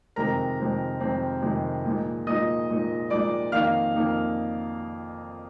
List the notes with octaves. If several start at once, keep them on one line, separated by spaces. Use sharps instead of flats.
F2 C3 D#3 G#3 C4 A#4 A#5
F2 C3 D#3 G#3 C4
F2 C3 D#3 G#3 C4
F2 C3 D#3 G#3 C4
A#2 F3 G#3 D#4
A#2 F3 G#3 D#4 D#5 D#6
A#2 F3 G#3 D#4
A#2 F3 G#3 D#4 D5 D6
F2 D#3 A#3 D#4 F5 F6
F2 D#3 A#3 D#4